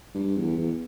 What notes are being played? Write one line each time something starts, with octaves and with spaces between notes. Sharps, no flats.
G2
E2
E2